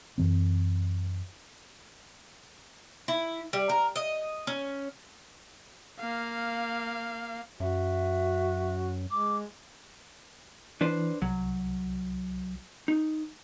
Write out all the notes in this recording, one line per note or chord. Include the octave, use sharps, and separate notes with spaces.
F#2 E3 C4
E4
G3
A#4
D#5
C#4
A#3 F5
F#2 F#4 E5
G#3 D6
E3 D4 B4 C5
C2 F#3
D#4